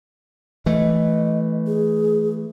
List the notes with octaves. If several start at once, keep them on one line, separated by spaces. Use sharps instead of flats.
E3 A3 D#5
G#4